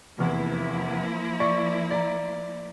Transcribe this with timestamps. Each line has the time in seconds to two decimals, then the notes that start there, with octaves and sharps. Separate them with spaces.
0.18 F1 E2 F3 A#3 E4
1.40 D5 C#6
1.91 D5 A#5